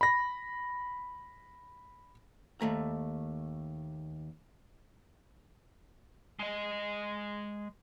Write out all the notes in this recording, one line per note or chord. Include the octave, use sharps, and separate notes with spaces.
B5 A#6
D#2 A3 A#5
G#3 D#5